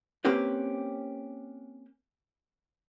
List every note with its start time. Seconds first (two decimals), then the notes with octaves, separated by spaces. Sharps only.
0.25 A#3 C4 C#4 G4 A#4 B4